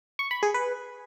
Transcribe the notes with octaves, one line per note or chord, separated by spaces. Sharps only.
C#6
B5
G#4
B4